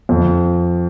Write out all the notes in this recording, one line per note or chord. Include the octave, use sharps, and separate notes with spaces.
F2